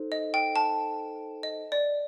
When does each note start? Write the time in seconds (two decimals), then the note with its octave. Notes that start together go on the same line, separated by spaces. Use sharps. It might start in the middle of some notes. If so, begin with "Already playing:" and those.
Already playing: D#4 A4 C5
0.12 D#5
0.34 G5
0.56 A5
1.43 D#5
1.72 D5